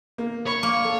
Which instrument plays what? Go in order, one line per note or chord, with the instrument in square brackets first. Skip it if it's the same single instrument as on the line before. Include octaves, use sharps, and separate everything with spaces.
[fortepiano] A#3
[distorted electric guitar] C#5 [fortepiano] B5
[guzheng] A#3
[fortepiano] A4